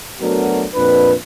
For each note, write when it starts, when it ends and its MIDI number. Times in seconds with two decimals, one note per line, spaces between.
0.21 0.65 54
0.21 0.65 57
0.21 0.65 59
0.21 0.65 62
0.21 0.65 66
0.21 0.65 70
0.75 1.14 41
0.75 1.14 46
0.75 1.14 62
0.75 1.14 71